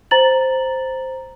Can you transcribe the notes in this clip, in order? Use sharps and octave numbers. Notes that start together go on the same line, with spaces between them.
C5 A#5 A6 F#7